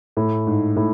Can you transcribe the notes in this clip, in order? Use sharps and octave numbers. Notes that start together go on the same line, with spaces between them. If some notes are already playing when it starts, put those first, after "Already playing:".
A2
G#2
A2